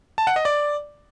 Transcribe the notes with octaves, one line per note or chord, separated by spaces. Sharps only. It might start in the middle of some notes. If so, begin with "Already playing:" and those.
A5
F#5
D#5
D5